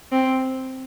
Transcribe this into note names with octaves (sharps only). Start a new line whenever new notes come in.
C4